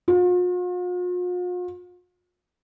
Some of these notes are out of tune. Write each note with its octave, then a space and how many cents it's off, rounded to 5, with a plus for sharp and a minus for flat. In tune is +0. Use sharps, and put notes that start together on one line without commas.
F4 +45